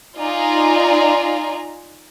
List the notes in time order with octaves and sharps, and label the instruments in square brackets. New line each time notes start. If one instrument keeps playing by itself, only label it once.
[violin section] D#4 F4 D5 D#5 G#5 A#5